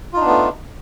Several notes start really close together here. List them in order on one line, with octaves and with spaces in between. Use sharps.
F4 D#4 D4 B3 A3